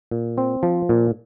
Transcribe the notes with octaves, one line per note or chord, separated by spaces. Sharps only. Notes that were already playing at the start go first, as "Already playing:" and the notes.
A#2
C4
F3
A#2